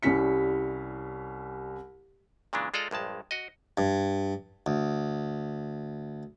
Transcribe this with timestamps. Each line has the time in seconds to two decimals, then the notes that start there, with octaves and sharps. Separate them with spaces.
0.03 C2 G3 C#4 E4 B6 C#7
2.53 A#2 C#3 E3 G#3 D4
2.74 G#3 F4 A4 D5 D#5 A#5
2.91 A#1 G2 G#3 A5
3.31 F#4 D#5
3.78 G2
4.66 D2